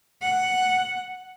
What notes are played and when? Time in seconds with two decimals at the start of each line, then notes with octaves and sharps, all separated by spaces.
0.22 F#5